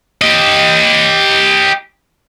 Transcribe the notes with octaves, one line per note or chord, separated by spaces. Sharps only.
G4 D#5